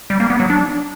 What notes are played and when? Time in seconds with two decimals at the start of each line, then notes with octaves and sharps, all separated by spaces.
0.10 G3
0.20 A#3
0.30 B3
0.40 F#3
0.50 D4